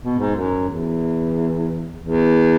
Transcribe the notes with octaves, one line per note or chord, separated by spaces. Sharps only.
B2
G#2
F#2
E2
E2